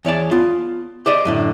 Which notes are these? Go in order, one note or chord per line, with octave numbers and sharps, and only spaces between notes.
E2 C#5 D5 A5
B3 F4
G4 C5 D5 D#5
F#2 A2 D3